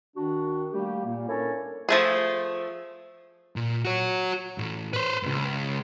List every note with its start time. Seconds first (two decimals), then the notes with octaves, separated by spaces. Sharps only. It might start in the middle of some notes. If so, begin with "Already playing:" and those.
0.16 D#3 D4 F#4
0.72 G3 A3 A#3 G4
1.05 A#2 A#3
1.29 C#4 D4 E4 A4 A#4 C#5
1.89 F3 A3 G#4
3.56 A#2
3.85 F#4 C#5
4.58 A2 E3
4.93 B4 C5
5.23 C#2 G#2